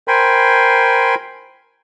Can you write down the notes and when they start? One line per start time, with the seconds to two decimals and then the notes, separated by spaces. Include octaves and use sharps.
0.08 A#4 C5 G5 G#5 B5 C6